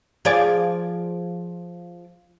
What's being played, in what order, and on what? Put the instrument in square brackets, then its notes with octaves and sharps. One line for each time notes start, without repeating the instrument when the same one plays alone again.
[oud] F3 G#4 D5